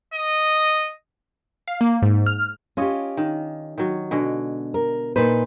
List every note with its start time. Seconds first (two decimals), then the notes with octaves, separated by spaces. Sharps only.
0.14 D#5
1.68 F5
1.81 A#3
2.02 G#2
2.26 F6
2.77 C#4 F4 G4 C#5 D#5
3.17 D#3
3.78 D#3 F#3
4.11 B2 D3 G#3
4.74 A#4
5.16 A#2 D#4 B4 C5